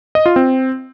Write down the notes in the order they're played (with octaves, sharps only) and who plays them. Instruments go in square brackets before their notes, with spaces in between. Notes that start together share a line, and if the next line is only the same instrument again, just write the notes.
[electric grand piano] D#5
F4
C4